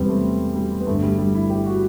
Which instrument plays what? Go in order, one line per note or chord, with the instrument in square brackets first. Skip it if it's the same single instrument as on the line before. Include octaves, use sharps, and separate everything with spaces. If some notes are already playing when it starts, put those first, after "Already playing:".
Already playing: [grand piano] E1 E2 C3 E3 G3 B3 C4
A3
G3
B3
G1 G2 D3 A3
G3
G3
E4
G4
F#4